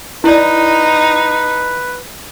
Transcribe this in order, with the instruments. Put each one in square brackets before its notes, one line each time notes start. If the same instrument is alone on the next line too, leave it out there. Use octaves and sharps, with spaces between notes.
[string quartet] D#4 [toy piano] E4 D5 [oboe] B4